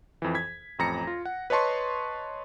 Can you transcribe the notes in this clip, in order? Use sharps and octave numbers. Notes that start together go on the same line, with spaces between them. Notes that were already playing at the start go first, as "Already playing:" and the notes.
F2 E3
G#6 B6
A1 F2 A#5 A#6 C#7
F4
F#5
B4 C#5 D#5 A5 C6 C#6